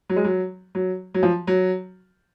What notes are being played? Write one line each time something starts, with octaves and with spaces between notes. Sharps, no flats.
F#3
G#3
F#3
F#3
F#3
F3
F#3